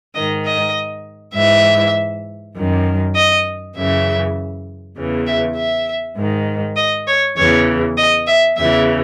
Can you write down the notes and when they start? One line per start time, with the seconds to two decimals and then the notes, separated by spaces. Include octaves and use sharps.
0.15 G#2 D#3 D#5
0.46 D#5
1.35 G#2 E3 E5
2.56 F#2 D#3
3.16 D#5
3.75 F#2 C#3 E3 E5
4.97 E2 C#3 E3
5.26 E5
5.56 E5
6.16 G#2 D#3
6.76 D#5
7.07 C#5
7.37 E2 C#3 E3 C#5
7.98 D#5
8.27 E5
8.57 E2 C#3 E3 E5